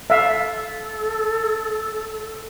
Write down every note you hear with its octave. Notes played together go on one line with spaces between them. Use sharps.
A4 E5 F5